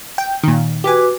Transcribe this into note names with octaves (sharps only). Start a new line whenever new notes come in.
G5
A#2 D#3
F#4 G4 B4 G#5 D6